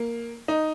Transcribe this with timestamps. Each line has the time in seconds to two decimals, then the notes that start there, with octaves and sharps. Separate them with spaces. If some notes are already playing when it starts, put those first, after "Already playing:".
Already playing: A#3
0.48 D#4